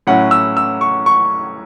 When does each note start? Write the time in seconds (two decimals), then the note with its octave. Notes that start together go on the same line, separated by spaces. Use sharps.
0.07 A2 F#3 C#4 E4 F#5
0.31 E6
0.57 E6
0.81 C#6
1.06 C#6